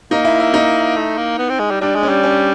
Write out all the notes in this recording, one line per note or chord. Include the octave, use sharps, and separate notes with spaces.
A#3 D#4
E4
E4
D#4
A3
A#3
B3
C4
G#3
G3
G3 D4
G#3
C#4
G3
C#4